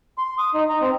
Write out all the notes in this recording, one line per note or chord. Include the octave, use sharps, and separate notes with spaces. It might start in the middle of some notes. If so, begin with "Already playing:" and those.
C6
D#6
D#4
A#5
C4